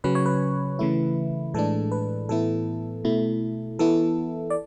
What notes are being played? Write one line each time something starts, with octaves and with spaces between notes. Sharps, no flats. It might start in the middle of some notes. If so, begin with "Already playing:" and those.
C#3 F#3 C#4 B4
C#5
B4
C#3 E3 A3 E4
A2 E3 G#3 D4 A4
B4
A2 E3 B3 E4 A4
B2 A3 E4
E3 B3 E4 A4
D5